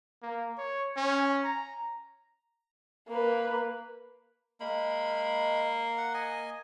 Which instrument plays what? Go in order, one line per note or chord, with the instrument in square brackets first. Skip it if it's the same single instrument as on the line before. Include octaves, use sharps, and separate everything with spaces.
[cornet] A#3
C#5
C#4
A#5
[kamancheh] A#3 B4
[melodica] G#3 B5 [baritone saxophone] A#3
[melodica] F#5
D#5 G#5